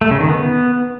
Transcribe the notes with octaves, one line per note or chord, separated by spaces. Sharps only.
A3
C#3
D#3
B3